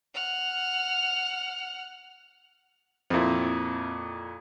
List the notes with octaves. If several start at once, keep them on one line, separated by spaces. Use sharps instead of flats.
F#5 F6
F2 A#2 C4 E4